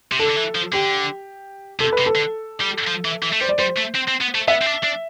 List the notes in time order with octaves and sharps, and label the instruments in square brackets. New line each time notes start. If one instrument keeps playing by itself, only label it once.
[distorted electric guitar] C3
[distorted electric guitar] D3 [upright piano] A4
[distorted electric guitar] D3
E3
F3
[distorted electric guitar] D3 [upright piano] G4
[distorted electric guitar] C3 [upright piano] A4
[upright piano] B4
[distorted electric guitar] C3
[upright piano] A4
[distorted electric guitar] D3
G3
F3
E3
E3
A3
[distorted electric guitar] G3 [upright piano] C5
[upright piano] D5
[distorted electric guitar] G3 [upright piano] C5
[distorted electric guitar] A3
C4
C4
B3
A3
[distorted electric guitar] B3 [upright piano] E5
[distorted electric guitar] C4
D4
D4